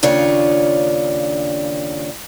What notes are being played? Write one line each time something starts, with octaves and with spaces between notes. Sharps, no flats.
D#2 C#3 D4 F4 C#5